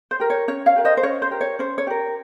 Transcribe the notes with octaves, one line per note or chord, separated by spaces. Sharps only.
C5
G4 A#4
C#5
C#4 C#5
C#5 F5
G4 A#4
C5 D#5
C5
C#4 C#5
C5
G4 A#4
C#5
C#4 C5
C#5
G4 A#4